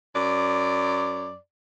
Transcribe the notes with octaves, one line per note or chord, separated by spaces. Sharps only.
F#2 D5